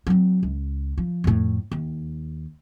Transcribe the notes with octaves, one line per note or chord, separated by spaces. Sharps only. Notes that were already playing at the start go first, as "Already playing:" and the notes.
F#3 C4
C#2
F3
F2 A2
D#2